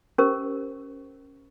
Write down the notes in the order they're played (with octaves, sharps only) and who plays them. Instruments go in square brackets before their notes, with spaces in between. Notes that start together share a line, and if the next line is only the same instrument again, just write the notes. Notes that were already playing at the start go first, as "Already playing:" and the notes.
[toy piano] C#4 G4 A#4 C5